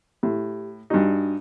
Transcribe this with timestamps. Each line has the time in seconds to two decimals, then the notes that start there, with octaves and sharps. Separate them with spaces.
0.23 A2 G4
0.90 G2 D4 D#4 F#4 G4